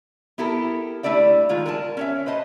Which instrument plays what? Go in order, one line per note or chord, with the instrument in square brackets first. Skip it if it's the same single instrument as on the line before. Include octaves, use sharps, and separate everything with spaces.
[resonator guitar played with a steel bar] B3 E4 G4 A4 A#4
G3 A3 D4 E4 D5 E5
D#3 G#3 F4
A#4 D5 G#5 A5
C#4 C#5 E5
B4 C5 D#5 A5